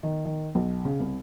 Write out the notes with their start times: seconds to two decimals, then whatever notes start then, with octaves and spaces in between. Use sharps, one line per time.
0.03 D#3
0.25 D#3
0.55 B1
0.85 C#3
1.00 C2